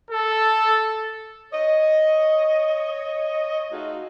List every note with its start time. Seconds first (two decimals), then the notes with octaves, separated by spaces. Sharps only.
0.11 A4
1.52 C#5 D#5
3.72 A3 D#4 F4 F#4 G#4